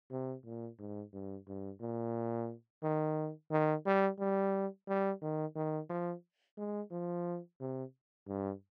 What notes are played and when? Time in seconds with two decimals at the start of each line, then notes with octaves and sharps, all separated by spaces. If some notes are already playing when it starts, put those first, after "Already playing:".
0.11 C3
0.45 A#2
0.79 G#2
1.13 G2
1.47 G2
1.81 A#2
2.83 D#3
3.51 D#3
3.86 G3
4.19 G3
4.88 G3
5.22 D#3
5.56 D#3
5.90 F3
6.57 G#3
6.91 F3
7.60 C3
8.27 G2